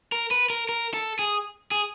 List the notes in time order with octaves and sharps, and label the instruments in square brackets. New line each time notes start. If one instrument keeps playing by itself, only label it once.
[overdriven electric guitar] A#4
B4
A#4
A#4
A4
G#4
G#4